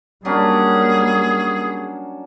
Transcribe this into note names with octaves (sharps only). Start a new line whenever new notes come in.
F#3 G3 A#3 C#4 D4 G#4